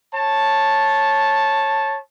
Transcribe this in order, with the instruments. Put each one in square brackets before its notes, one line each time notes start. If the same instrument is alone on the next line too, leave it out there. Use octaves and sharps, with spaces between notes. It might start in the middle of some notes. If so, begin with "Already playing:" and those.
[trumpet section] C#5 A5